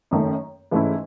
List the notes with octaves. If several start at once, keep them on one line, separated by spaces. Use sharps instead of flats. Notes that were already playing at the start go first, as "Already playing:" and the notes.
F#2 D#3 A3
G#2 E3 A3 C#4 E4